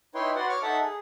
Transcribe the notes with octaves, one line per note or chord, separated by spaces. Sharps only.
D#4 E4 B4 C#5 G5 C6
F#4 B4 D5 F#5 C6
C#5 C#6 D6 F6
D#4 A4 E5 F#5 A5
G#4